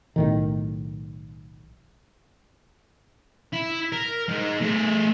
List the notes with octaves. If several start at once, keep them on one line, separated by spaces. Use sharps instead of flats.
B1 A2 D#3
E4
A#4
G#3 D#4
A3 G#4